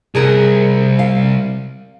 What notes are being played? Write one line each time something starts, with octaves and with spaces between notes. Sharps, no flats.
C2 G#4 A#4
F5